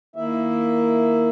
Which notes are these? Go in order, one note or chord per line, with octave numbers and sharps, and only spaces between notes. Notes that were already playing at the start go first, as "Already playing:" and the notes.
D#3 A#3 E4 E5